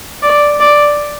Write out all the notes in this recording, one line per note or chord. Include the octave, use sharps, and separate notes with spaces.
D5
D5